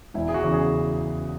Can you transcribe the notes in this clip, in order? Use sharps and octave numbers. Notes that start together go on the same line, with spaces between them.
E1 E4
G#4
F#4
E2 C#3
G#4